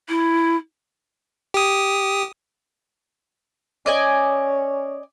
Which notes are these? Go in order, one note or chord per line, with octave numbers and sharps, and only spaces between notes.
E4
G4 D#6
C#4 D5 D#5 G#5